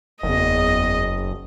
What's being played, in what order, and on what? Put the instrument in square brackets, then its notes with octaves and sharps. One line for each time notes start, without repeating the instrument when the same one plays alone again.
[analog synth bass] F#1 [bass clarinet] E2 [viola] D#5